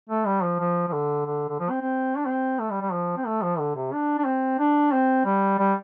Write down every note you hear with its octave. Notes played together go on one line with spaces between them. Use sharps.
A3
G3
F3
F3
F3
D3
D3
D3
F3
C4
C4
D4
C4
A3
G3
G3
F3
C4
A3
F3
D3
C3
D4
D4
C4
D4
C4
G3
G3